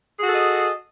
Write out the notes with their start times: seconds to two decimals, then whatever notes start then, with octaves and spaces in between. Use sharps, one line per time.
0.19 G#4
0.23 F#4
0.28 A4
0.32 D#5